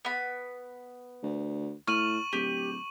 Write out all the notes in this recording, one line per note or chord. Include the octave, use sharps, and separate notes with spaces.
B3 B5
D2
A2 C#6 F6 D#7 F#7
D1 G4